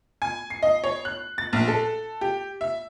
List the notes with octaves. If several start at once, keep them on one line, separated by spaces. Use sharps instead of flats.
G#5
C7
D#5
C#5
F#6
A6
A#1
A4
G4
E5